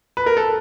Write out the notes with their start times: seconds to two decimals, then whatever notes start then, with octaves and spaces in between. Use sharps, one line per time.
0.17 B4
0.26 A#4
0.37 A4